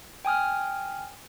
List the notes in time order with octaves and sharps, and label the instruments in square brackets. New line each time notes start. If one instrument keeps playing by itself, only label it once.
[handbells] G5 G#5 D#6 F6